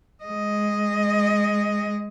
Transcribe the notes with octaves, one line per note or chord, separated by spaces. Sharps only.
G#3 D#5